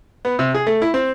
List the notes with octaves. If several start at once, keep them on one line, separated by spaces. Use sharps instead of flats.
B3
C3
G#4
A3
E4
C4